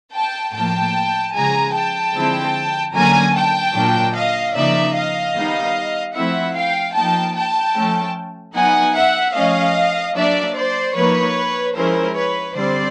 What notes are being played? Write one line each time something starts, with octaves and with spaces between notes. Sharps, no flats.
G5 A5
A2 F3 A#3 G5 A5
C#3 F3 G#3 G#5 A#5
G5 A5
D3 F3 G#3 C4 E4
D3 F#3 A#3 C#4 G#5 A#5
G5 A5
A#2 F#3 A#3 D4
D#5 F5
C#3 F3 A#3 D#4 D5 E5
D#5 F5
D#3 G3 B3 D#4
F3 A3 C4 E4 E5 F#5
F5 G5
F3 A#3 D#4 G5 A5
G5 A5
F3 A3 C#4
F#3 B3 D#4 F#5 G#5
E5 F#5
F3 A3 C#4 D#5 F5
F#3 A#3 D4 D5 E5
C5 D5
F3 A#3 D#4 B4 C#5
F3 G#3 C#4 E4 A#4 C5
B4 C#5
D3 G3 C4 C5 D5